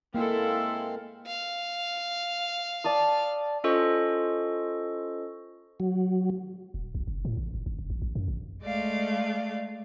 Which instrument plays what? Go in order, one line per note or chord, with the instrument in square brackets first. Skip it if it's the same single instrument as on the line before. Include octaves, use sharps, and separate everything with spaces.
[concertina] G#3 C4 F5 [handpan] A#3 [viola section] E4 A4
[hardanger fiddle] F5
[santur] D5 A5 D#6
[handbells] C#4 F4 A4 C5 D#5 C#6
[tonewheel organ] F#3
[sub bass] D#1
A#1
F#1
A2
A1
F#1
G#1
F#1
A1
A1
F#2
A1
[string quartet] G#3 A3 D5 F5